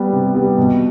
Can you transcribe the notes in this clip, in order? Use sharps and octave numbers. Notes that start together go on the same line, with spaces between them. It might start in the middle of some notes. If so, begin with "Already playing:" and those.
Already playing: G3 B3
C3
G3 B3
B2